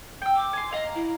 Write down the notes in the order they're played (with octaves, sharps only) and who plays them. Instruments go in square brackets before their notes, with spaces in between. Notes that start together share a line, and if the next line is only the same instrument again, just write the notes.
[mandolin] G5 E6
[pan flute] D6
[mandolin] G#5 C6
[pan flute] D#5 [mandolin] F5 A#5
[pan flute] E4